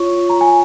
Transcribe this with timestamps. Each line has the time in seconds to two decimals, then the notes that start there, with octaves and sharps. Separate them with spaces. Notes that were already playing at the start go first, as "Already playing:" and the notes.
Already playing: F4 C#5 C#6
0.30 A#5
0.41 G#5